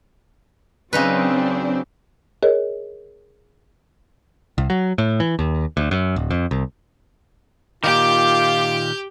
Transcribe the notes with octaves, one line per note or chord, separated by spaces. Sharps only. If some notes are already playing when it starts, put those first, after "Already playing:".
C#3 F#3 C4 D4 D#4 B4
G#4 A#4 C#5 D#5
C2
F#3
A2
E3
D#2
D2
F#2
D1
F2
C2
A#2 D#3 F4 G4 G5 D6